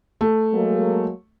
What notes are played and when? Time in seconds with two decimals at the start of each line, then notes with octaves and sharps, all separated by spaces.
0.21 A3
0.53 F#3 G#3 A#3